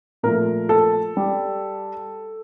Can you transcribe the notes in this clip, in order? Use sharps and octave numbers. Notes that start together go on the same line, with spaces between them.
A#2 F3 A3 A#4
A4
G3